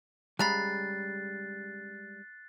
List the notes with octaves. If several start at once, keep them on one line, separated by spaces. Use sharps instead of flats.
C#3 G3 G#3 A#5 B5 F#6 A6 C7